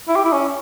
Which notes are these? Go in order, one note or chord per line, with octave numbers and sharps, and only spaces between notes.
E4
G4
E4
C#4